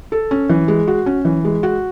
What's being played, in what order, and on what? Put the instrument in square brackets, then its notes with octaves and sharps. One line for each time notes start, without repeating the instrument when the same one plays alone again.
[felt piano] A4
C#4
E3
G#3
F#4
C#4
E3
G#3
F#4